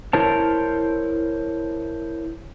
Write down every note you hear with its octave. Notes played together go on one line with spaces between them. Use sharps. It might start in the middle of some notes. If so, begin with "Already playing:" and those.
E4 A#4 C5 C#5 A5